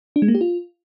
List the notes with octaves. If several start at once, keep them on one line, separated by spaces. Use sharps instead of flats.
D4
G#3
A#3
G4
F4